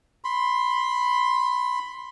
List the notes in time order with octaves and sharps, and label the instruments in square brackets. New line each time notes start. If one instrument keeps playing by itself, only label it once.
[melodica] B5 C6